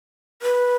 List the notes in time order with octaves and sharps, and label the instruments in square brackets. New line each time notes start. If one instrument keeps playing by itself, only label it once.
[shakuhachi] B4